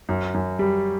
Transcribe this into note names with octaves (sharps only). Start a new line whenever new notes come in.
F#2
F#2
G3